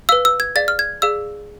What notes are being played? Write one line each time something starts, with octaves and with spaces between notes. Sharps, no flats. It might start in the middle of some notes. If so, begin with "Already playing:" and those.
B4 F5 E6
E6
G#6
G#4 D5 F5 A6
F6
G#6
G#4 D5 F5 E6